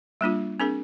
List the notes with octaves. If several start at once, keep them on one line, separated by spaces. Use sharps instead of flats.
G3 A#3 D4 F4
C4 D4 G#4 A#4